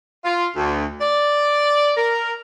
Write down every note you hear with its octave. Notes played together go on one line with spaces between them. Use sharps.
F4
D2
D5
A#4